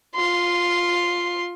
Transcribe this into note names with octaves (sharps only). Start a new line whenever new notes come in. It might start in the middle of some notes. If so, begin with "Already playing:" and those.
F4 C6